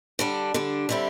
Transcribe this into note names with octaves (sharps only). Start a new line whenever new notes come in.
D3 G3 D4
D3 G3 D4
D3 G3 C4 E4